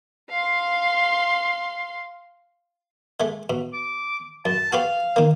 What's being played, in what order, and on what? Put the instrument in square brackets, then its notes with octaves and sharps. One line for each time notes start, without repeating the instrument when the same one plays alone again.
[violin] F5 C6
[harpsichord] G#3 A3
B2
[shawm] D6
[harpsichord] F#2 [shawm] A5
[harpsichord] F#4 G4 B4 [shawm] F5
[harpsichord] D#3 A#3